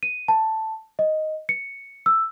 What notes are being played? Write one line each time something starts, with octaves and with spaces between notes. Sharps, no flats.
D#7
A5
D#5
C#7
E6